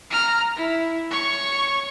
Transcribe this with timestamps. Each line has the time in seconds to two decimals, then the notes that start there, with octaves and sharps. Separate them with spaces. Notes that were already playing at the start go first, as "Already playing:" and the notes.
0.11 A#5 F6
0.56 E4
1.11 C#5 C#6